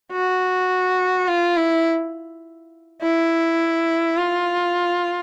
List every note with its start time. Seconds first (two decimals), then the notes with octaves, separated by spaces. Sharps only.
0.12 F#4
1.28 F4
1.56 E4
3.02 E4
4.18 F4